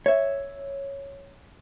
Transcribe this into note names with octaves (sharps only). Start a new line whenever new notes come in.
C#5 E5